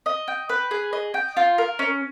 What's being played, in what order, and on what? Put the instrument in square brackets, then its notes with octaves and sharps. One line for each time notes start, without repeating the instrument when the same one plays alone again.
[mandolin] D#5
G5
B4
G#4
D#5
G5
F4
A#4
C#4